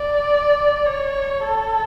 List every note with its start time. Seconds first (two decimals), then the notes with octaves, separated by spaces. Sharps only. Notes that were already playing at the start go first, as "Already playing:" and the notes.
Already playing: D5
0.86 C#5
1.44 A4